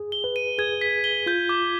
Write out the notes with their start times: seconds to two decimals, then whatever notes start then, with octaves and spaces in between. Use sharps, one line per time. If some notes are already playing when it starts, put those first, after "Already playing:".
Already playing: G#4
0.12 G7
0.24 B4
0.36 D#7
0.58 G#4 G#6
0.81 B6
1.04 G7
1.26 F4 G6
1.49 D6